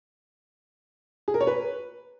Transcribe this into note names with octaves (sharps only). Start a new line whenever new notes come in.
G#4
A#4
C#5
B4